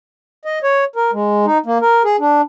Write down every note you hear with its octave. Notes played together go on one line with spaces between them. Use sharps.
D#5
C#5
A#4
G#3
D#4
A#3
A#4
G#4
D4